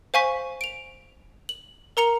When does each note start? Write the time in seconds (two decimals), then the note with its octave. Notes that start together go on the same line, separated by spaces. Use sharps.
0.14 C5 F5 G#5 C#6 B6
0.61 D7 F7
1.49 F#7
1.97 A#4 A#5 C#7 F7